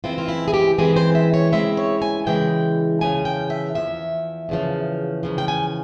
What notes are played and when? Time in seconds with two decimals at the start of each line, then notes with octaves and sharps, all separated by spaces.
0.04 C#3 E3 G#3 C4 E4 F4
0.18 F4
0.28 E4
0.48 G#4
0.54 G4
0.78 C#3 E3 G#3 C4 E4 G#4
0.96 C5
1.15 E5
1.34 C#5
1.52 C#3 E3 G#3 C4 E4 E5
1.77 C#5
2.02 G#5
2.26 C#3 E3 G#3 E4 G5
3.01 E2 C#3 F3 G#5
3.25 G5
3.50 E5
3.75 E2 C#3 F3 E5
4.49 E2 C#3 F3
5.23 E2 C#3 F3
5.38 G5
5.48 G#5